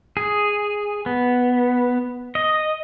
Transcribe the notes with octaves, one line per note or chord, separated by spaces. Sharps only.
G#4
B3
D#5